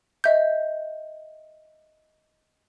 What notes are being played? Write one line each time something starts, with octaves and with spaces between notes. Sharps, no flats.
D#5 E5 G6